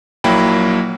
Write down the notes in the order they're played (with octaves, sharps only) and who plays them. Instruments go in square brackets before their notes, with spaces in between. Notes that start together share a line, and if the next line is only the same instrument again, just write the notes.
[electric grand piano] A#1 F#3 A#3 E4 G5 B5